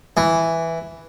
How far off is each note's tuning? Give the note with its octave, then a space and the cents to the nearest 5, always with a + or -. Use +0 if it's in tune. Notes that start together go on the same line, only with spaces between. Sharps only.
E3 +0